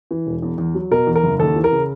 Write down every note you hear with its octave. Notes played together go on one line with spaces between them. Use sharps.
E3
E1
E2
E2
F#3
B2 A#4
E2
A#4
F#1
D#2 A4
E3
A#4
C#3